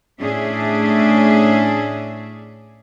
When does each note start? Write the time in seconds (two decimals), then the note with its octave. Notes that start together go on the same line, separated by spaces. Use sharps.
0.20 A2 C#4 D4 G#4 E5